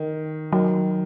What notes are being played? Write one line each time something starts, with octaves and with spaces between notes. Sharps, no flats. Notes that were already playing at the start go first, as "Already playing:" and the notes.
Already playing: D#3
D#3 F#3